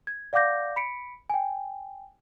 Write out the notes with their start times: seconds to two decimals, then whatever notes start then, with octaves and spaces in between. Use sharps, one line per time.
0.07 G#6
0.33 D5 F5 F#5 D6 G6 A#6
0.76 B5 B6 C#7 D7
1.30 G5 G#5